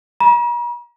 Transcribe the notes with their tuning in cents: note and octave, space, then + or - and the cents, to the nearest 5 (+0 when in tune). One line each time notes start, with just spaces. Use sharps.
A#5 +45